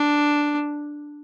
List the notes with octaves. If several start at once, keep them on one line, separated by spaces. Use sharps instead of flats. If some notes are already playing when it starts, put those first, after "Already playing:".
Already playing: D4